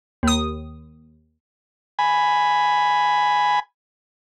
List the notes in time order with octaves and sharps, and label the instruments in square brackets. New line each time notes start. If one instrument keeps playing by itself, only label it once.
[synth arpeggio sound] D#2 D#6
[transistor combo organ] G#5 B5